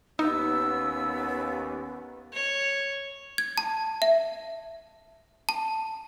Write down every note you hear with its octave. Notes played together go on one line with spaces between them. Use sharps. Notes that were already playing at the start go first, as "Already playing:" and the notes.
D#2 B3 C#4 D#4 E6
C#5
G#6
A5
E5
A5